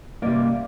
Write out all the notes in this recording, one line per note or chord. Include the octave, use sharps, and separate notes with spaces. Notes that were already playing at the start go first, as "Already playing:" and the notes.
C3 G3 A#3 D5